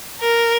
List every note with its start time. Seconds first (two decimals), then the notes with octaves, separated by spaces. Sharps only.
0.21 A#4